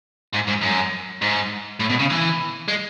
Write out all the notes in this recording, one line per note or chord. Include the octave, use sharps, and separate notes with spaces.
G#2
G#2
F#2
G#2
A2
B2
C#3
E3
G#3